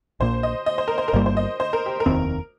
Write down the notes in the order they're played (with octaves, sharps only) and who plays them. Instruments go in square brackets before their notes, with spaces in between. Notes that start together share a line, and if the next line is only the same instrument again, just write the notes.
[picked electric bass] A#1 A#2 A#3 [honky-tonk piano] C5
[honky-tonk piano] D#5
D#5
C5
A#4
C5
A#4
[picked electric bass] G1 G2 G3 A#3 [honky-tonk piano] C5
[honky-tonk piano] C5
D#5
C5
A#4
G4
A#4
[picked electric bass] F1 D#2 D#3 C4